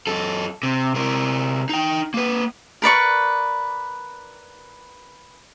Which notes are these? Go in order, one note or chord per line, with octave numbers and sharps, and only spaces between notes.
F#2 A4
C3
C3 A#4
D#4 G5
A#3 B4
A#4 B4 D5 C#6